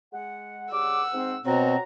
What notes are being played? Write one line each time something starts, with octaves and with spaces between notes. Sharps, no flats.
G#3 F#5
C#3 G3 F#5 D6 E6
G#2 C4
B2 C4 F#4 C#5 A#5